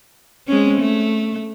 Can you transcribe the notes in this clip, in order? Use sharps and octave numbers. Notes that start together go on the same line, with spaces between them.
G#3 C4 C#4
A3